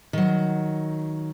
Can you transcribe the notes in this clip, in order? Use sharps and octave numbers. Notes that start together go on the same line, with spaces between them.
D#3 F#3